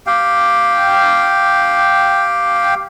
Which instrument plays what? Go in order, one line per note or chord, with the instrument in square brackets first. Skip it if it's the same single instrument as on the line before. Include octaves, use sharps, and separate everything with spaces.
[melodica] G4 F5 G5